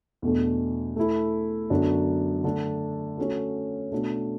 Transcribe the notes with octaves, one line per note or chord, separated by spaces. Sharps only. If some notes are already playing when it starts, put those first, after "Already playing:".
E2 B2 A3 D4 A4
A3 E4 A4
F#2 D3 F#3 B3 D4
D3 A3 D4
A3 C#4 F#4 A4
B2 A3 D4 F#4 A4